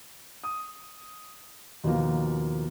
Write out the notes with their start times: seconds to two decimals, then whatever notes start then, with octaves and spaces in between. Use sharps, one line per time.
0.44 D#6
1.84 D#2 B2 F3 A#3